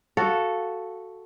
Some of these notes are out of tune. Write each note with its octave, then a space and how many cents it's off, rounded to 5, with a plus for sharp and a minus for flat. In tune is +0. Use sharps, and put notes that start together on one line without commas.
F#4 +0 A4 +0 F5 +0